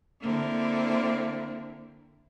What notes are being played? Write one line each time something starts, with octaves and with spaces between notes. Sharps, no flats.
D3 A#3 C4 E4